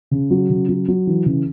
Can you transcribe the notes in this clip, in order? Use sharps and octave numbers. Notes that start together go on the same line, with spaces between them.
C#3
F#3
C#3
F#3
F#3
E3
C#3